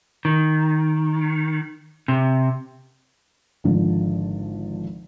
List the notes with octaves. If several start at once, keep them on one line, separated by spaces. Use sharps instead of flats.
D#3
C3
G#1 D3 F3